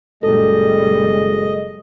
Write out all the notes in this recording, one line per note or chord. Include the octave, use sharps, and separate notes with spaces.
F#1 A#2 G3 G#3 A4 D#5